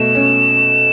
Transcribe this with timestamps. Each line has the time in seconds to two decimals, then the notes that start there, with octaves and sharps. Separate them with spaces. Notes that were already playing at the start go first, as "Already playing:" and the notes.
Already playing: B2 A3 E7
0.15 C#4